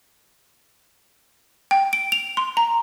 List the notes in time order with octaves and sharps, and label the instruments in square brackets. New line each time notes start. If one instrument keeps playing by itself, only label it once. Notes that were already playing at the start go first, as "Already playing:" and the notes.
[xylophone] G5
D7
F7
C6
A#5